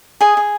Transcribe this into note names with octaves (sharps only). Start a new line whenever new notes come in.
G#4 D#5 G#5
G#4